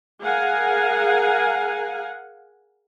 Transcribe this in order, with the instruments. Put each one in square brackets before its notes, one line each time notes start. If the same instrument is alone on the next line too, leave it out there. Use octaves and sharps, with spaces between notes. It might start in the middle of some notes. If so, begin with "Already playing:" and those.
[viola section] G#4 A#4 F5 F#5 G#5